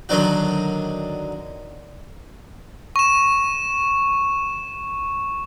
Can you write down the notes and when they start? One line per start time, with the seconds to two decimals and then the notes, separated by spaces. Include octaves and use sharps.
0.09 D3 D#3 F#3 D4 F#4
2.96 C#6 E7